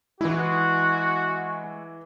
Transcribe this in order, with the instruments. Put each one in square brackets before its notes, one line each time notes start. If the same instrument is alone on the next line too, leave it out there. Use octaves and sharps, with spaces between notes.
[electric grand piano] E3 E4 [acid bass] G#3 [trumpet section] F#4